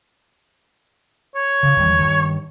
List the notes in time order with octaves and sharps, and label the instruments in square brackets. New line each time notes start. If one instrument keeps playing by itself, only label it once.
[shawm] C#5
[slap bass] C#3
E2 D#3 G3
G2 D#3